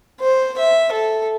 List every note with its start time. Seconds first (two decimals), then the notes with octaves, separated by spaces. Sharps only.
0.20 C5
0.58 E5
0.92 A4